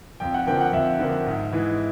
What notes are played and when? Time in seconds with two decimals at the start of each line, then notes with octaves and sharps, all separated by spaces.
0.20 F2 G5
0.34 F#5
0.47 D3 F3 A#3 G5
0.61 F#5
0.73 F2 E5
0.99 D3 F3 A#3
1.26 G#2
1.53 E3 G#3